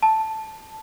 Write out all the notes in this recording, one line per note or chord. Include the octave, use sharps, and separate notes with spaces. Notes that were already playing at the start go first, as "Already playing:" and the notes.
A5